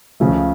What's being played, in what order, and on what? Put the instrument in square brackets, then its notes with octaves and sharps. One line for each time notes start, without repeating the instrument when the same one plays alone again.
[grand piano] C#2 C#3 F3 A3